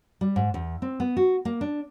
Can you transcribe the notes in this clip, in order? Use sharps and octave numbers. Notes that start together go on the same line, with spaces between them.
G3
G#2
E2
C4
B3
F#4
A#3
D4